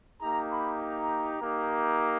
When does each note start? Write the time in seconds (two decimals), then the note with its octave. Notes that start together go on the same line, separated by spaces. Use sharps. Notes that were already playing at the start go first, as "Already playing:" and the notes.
0.21 A#3 D#4 G4 A#5
0.51 B5
0.81 A#5
1.40 A#3 D#4 G4